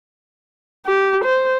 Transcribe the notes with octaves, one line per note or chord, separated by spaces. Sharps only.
G4
C5